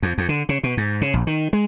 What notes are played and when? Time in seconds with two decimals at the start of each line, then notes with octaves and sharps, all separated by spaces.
0.03 F2
0.18 F2
0.29 D3
0.49 C#3
0.63 B2
0.77 G#2
1.01 C#3
1.14 A#1
1.27 D#3
1.53 G#3